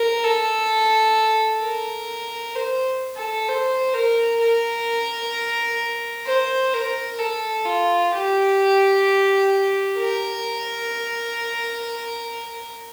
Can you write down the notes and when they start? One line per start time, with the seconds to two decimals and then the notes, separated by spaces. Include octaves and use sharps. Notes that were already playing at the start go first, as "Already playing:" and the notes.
Already playing: A#4
0.24 A4
1.62 A#4
2.55 C5
3.17 A4
3.48 C5
3.94 A#4
4.40 A#4
6.26 C5
6.73 A#4
7.19 A4
7.66 F4
8.12 G4
9.98 A#4